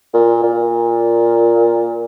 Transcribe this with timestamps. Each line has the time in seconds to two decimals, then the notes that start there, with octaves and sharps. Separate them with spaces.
0.14 A#2
0.44 A#2